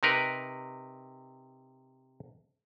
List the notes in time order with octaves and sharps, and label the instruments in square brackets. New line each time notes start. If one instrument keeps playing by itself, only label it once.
[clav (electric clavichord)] C3 D#4 A#4 B4